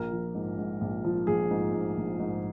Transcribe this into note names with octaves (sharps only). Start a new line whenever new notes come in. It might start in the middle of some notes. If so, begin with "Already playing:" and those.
Already playing: A#1 A#4
F3
G#2
G#2
A#1
F3
A#1 G#4
G#2
G#2
A#1
G#2